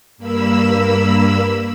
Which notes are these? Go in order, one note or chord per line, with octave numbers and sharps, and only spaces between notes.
G2 A#3 B5 E6